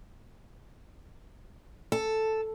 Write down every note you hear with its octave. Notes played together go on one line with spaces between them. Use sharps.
A4